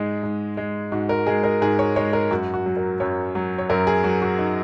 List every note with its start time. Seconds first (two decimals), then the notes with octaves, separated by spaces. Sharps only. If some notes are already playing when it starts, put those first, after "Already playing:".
Already playing: G#2 G#3 G#4
0.23 G#2
0.57 G#3
0.92 G#2 F#4
1.09 A#4
1.27 G#3 G#4
1.44 A#4
1.61 G#2 G#4
1.79 C#5
1.96 G#3 C#5
2.13 A#4
2.30 F#2 F#4
2.54 F#4
2.66 F#3
2.77 A#4
3.00 F#2 C#5
3.35 F#3
3.58 C#5
3.69 F#2 A#4
3.87 G#4
4.04 F#3 F#4
4.22 F#4
4.39 D#4